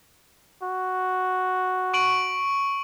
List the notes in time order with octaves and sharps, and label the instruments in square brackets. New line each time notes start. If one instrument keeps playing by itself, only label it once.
[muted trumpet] F#4
[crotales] C#6 D7 F#7